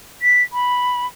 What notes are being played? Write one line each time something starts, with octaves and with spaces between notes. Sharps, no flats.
B6
B5